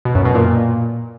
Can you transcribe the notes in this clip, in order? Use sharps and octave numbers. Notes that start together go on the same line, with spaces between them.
B2
F#2
B2
A#2